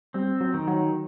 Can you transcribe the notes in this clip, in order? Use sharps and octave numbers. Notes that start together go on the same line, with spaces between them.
G3 C4
F#3
D#3
F#3